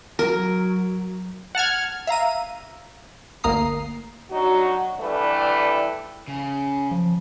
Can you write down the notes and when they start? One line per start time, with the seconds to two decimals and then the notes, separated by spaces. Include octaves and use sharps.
0.19 F#3 A#4
1.55 F#5 A5 F6 G#6
2.07 E5 F5 A#5 D#7
3.44 G1 D2 A#3 A#5 D#6 C7
4.31 F#3 D4 D#4 F#4
4.99 D3 E3 G3 A3 E4 B4
6.28 C#3
6.91 F3